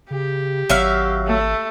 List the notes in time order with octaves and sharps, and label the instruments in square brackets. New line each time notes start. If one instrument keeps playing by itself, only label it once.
[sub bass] C#3 [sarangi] G4
[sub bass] G#1 [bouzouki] F#3 E5 F5
[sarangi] A3